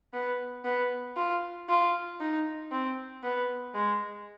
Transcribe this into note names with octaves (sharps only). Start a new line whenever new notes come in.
B3
B3
F4
F4
D#4
C4
B3
G#3